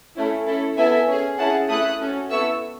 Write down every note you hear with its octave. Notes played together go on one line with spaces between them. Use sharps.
A3 C#4 E4
C#4 E4 A4
B3 E4 A4 E5 G#5
C#4 G#4
C#4 E4 G#4 F#5 A5
A3 E4 A4 D#6 F#6
C#4 F#4 A4
B3 E4 A4 C#6 E6